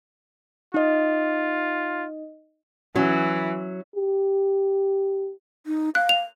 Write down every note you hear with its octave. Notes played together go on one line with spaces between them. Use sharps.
D#4 F4 D#5
E3 F#3 C#4 F#4
G4
D#4
F5 F#6
F7